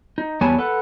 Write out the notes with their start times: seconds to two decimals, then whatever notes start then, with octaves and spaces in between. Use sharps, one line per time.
0.18 D#4
0.41 E2 G3 B3 C#5 G#5 A5
0.58 A4 B4 F#5